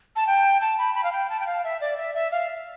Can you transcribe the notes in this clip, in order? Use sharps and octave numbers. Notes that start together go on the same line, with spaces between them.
A5
G5
A5
B5
B5
F5
G5
A5
G5
F5
E5
D5
E5
E5
F5